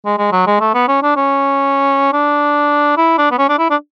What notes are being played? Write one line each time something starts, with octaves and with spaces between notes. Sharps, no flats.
G#3
G#3
F#3
G#3
A3
B3
C#4
D4
C#4
D4
E4
D4
B3
C#4
D4
E4
D4